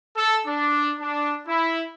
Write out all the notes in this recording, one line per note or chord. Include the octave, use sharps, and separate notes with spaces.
A4
D4
D4
E4